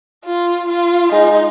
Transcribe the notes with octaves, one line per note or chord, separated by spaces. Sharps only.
F4
F4
G#3 D#4